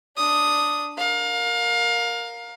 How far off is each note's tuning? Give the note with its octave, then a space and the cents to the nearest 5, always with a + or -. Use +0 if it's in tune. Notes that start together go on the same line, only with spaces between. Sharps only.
D4 +0 D#6 +0
A#4 +0 F5 +25